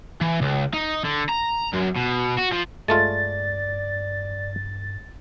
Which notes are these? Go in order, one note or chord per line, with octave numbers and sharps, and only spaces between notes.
E3
C#2
D#4
D3
A#5
F#2
B2
F#4
F3
G2 G#3 A3 F4 D5 A6